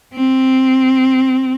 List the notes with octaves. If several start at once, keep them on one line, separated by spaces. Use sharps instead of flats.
C4